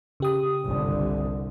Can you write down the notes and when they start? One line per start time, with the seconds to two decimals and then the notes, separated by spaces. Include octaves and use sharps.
0.20 C#3 G4 D#6
0.64 G1 C2 D3